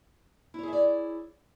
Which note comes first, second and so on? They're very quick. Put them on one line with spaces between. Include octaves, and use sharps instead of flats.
E4 C#5 G#4 E5 D5